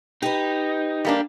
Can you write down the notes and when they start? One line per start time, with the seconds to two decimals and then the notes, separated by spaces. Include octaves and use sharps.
0.22 D#4 G4 B4
1.05 G3 A#3 D4